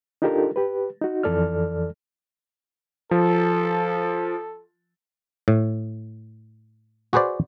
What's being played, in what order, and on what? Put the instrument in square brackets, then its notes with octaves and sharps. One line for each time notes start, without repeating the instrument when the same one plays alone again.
[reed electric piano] D4 D#4 F4 G4 A4 A#4
G4 B4
D#4 F#4
F2 E3 A4 D5 F6
[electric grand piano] F3 [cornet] A4
[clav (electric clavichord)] A2
F#4 G#4 B4 C5 D5